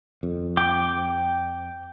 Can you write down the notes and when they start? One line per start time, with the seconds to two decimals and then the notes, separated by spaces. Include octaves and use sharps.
0.23 F2
0.57 G5 D6